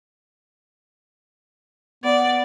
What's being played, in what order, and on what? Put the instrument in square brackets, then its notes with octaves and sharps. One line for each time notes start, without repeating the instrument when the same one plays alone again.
[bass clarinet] B3 [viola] D5